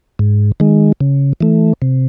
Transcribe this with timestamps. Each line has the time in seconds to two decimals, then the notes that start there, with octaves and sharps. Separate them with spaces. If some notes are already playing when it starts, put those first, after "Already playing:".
0.19 G#2
0.60 D#3 G#3
1.01 C#3
1.41 E3 A3
1.82 C3